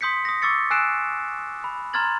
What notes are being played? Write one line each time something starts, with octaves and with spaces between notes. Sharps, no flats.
C6 D#6 G6 B6 C#7
D#6 A#6
C#6 D6 E6 A6 C#7
G#5 E6 F#6 C7 D7 E7
B5
A#5 C6 F6 G#6 A6 F#7